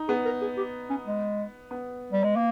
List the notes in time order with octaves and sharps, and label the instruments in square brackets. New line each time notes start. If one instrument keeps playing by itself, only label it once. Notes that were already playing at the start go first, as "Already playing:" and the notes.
Already playing: [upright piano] D#4
[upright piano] B3 [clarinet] G#4
[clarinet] A#4
G#4
G4
C#4
G#3
[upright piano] B3
[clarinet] G3
G#3
A#3